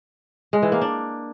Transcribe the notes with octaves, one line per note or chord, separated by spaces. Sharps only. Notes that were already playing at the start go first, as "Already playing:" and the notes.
G#3
E3
A#3
D4